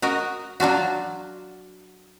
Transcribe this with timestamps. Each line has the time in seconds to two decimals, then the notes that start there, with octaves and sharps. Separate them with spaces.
0.02 F#4 A#4 D#5
0.60 F#3 D4 F4 F#4